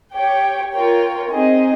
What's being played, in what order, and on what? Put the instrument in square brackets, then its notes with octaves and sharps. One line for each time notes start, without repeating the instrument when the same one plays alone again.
[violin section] G4 C#5 G5
F4 A#4 C#5 G5
C4 D#4 G#4 D#5